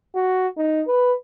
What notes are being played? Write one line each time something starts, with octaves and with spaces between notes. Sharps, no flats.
F#4
D#4
B4